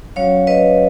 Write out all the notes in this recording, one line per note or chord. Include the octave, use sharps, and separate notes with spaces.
F#3 C#4 F#4 C#5 F5
B4 D#5